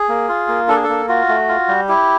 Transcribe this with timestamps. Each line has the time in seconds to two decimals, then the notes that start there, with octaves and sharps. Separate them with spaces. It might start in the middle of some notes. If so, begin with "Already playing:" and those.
Already playing: G#4
0.09 A#3
0.29 F4
0.48 A#3
0.68 D4 A4
0.76 G#4
0.84 A4
0.89 A#3
1.09 F4 F#4
1.29 A3
1.49 F4
1.68 G3
1.89 E4 G4